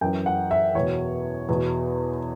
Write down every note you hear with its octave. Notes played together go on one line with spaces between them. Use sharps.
F#2 E3 G5
F#5
E5
E2 B2 C#5
E2 B2